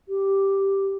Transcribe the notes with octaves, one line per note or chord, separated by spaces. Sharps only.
G4